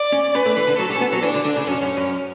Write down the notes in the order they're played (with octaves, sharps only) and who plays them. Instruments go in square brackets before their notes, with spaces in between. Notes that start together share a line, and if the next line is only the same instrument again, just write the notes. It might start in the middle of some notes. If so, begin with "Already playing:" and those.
Already playing: [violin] D5
[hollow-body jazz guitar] C#4
[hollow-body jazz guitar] C#4 [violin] B4
[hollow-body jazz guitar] A3
E3
D3
[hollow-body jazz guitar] F#3 [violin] A4
[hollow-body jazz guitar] G3
C#4
B3
F#3
[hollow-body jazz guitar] E3 [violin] D4
[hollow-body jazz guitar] D3
D3
C#3
[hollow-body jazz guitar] F#2 [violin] C#4
[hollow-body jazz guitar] F#2
F#2